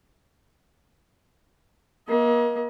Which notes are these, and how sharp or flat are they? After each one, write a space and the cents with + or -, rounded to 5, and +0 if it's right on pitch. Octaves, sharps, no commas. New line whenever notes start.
A#3 +35 D#5 +40